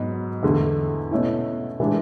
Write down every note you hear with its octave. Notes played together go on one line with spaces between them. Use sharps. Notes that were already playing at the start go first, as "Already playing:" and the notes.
Already playing: G#2 F#3 B3
E2 D3 A3
B2 A3 C#4 E4
A2 E3 G#3 D4